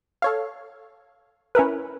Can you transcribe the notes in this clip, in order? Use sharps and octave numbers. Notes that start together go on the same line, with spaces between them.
A4 C#5 F5
C#4 E4 A#4 B4